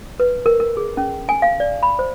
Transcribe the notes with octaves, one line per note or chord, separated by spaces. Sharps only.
B4
A#4
A#4
G#4
C#4
G#5
F5
D5
B5
C5